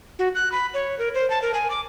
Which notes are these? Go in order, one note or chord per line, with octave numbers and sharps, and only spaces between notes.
F#4
F#6
B5
C#5
A#4
C5
A5
A#4
G#5
D6